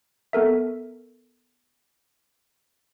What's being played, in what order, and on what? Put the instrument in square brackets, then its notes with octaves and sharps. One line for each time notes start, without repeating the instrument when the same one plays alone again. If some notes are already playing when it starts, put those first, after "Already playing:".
[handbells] B3 A4 A#4 E5